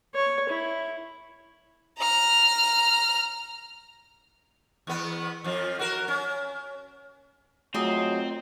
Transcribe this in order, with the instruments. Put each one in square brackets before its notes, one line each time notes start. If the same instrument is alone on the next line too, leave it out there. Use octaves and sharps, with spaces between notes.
[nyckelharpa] C#5
E4
[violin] A#5 F6
[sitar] E2 B3
F2 F3
F#4 A#4
C#4
[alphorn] F#3 [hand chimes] A3 F4 C7 [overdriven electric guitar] C4 [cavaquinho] G#4 D#5 E5